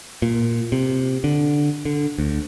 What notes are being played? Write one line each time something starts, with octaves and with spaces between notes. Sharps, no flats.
A#2
C3
D3
D3
D2